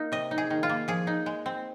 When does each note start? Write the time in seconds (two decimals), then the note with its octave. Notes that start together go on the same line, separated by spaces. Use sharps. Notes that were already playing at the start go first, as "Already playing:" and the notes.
Already playing: A#3 D#4
0.12 C3 D#5
0.31 D#4
0.38 G#4
0.50 D#3
0.63 F4
0.69 A#3
0.88 F3 G#4
1.07 D#4
1.26 G#3
1.46 C4